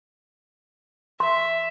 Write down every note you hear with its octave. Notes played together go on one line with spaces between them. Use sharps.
E5 C6